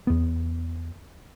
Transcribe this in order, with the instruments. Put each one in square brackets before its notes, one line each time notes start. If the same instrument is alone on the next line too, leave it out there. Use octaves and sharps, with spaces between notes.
[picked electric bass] E2 B3